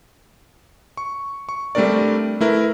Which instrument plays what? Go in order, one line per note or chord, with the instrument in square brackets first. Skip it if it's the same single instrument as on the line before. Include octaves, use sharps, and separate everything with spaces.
[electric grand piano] C#6
C#6
G3 A3 C4 D4 A#4 D5
A3 E4 A#4 B4